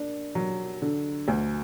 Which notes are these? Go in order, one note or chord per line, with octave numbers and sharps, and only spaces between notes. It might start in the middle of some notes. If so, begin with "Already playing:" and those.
Already playing: A#3 D4
F#3
D3
D2